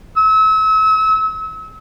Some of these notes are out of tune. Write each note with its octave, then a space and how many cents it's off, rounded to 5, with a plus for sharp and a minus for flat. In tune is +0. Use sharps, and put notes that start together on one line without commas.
E6 -35